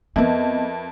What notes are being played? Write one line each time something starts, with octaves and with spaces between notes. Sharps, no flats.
F2 B3 E4 A#4 B4 D#5 E5